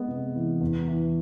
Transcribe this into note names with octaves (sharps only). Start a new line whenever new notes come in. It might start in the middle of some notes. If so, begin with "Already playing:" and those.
Already playing: G#3 B3
C3
E3
E2
E3